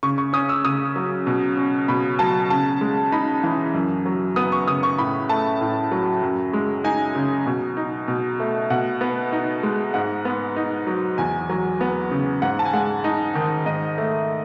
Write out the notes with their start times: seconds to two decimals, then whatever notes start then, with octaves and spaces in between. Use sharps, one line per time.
0.03 C#3 C#6
0.18 C#6
0.33 C#4 D#6
0.49 E6
0.65 C#3 D#6
0.96 F#3
1.27 B2
1.57 C#4
1.88 B2 B5
2.19 F#3 A5
2.50 C#3 A5
2.81 G#3
3.12 D#4 B5
3.44 E3
3.74 F#2
4.06 F#3
4.36 B3 D#6
4.52 C#6
4.68 C#3 D#6
4.83 C#6
4.98 A2 B5
5.29 A3 A5
5.61 A2
5.91 F#3
6.22 F#2
6.53 G#3
6.84 D#4 G#5
7.15 C#3
7.46 B2
7.77 D#4
8.08 B2
8.40 A3
8.70 B2 F#5
9.01 B3
9.33 D#4
9.63 G#3
9.94 G#2 F#5
10.25 B3
10.56 D#4
10.87 F#3
11.18 E2 G#5
11.49 F#3
11.81 B3
12.11 C#3
12.42 G#2 F#5
12.59 A5
12.65 G#5
12.73 G#3 F#5
13.04 D#4
13.35 D#3
13.66 G#2 D#5
13.98 A3